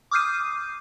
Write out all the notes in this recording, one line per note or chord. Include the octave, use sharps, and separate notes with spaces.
D6 D#6 F6 G6 C7 D#7